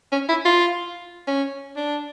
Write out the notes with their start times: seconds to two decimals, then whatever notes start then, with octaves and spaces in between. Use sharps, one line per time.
0.12 C#4
0.29 E4
0.45 F4
1.28 C#4
1.76 D4